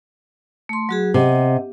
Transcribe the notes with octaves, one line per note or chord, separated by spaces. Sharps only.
A3 C6
F#3 F#4 G#4
C3 D#5 F#5